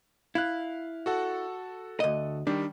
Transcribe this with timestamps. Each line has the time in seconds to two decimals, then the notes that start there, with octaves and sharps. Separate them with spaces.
0.35 E4 F5 F#6
1.06 F#4 A4 F#5
2.00 D2 D#5
2.47 D#3 G3 D4